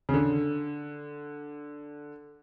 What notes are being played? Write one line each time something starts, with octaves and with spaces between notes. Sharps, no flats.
C#3
D3